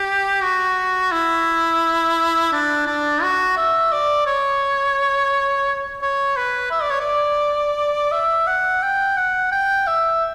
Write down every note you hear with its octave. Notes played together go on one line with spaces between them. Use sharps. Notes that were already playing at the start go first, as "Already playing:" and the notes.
Already playing: G4
F#4
E4
D4
D4
F#4
E5
D5
C#5
C#5
B4
E5
D5
C#5
D5
E5
F#5
G5
F#5
G5
E5